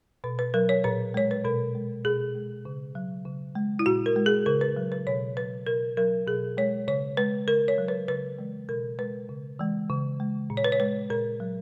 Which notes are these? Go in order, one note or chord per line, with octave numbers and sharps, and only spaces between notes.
B2 B4
B4
F#3 A#4
C#5
A#2 B4
G#3 C#5
B4
B2 A#4
G#3
B2 G#4
G#3
C#3
F#3
C#3
G#3
E4
A#2 F#4
A#4
G#3
G#4
C#3 A#4
B4
F#3
B4
B2 C#5
F#3 B4
B2 A#4
F#3 A#4
B2 G#4
G#3 C#5
C#3 C#5
G#3 B4
C#3 A#4
C#5
F#3
B4
C#3 B4
E3 G#3
B2 A#4
G#3 B4
C#3
E3 G#3
C#3
G#3
A#2
C#5
B4
C#5
G#3 B4
A#2 A#4
F#3